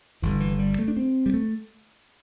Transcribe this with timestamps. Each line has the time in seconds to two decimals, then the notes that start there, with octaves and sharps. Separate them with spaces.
0.22 G1 G2 D3 E3
0.40 E3
0.59 G3
0.79 A3
0.88 D4
0.97 C4
1.26 G3
1.34 A3